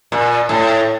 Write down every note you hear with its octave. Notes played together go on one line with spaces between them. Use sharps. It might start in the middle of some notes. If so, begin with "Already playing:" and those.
A#2
A2